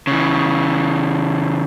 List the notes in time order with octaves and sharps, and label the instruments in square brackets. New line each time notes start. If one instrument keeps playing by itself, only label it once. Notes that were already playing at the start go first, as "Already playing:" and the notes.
[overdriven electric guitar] C#3 E3